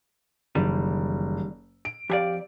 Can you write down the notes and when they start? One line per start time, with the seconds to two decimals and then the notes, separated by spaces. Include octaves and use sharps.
0.55 F#1 D#3 E3 G3
1.85 D7
2.10 F2 G4 G#4 D5 F5